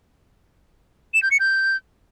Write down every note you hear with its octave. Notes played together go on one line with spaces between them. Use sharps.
E7
G6
C#7
G6